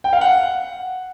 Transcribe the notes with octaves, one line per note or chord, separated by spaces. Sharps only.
G5
F5
F#5